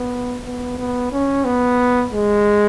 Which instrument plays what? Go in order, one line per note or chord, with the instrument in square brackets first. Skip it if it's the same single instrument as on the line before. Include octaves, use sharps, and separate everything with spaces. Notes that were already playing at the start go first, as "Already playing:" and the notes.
Already playing: [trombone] B3
B3
B3
C#4
B3
G#3